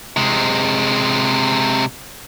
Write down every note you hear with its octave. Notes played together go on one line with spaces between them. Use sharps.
C3 G#3